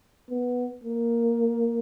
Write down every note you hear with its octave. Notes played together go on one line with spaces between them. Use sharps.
B3
A#3